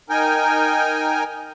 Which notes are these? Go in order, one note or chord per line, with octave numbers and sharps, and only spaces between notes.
D#4 A#4 G5 G#5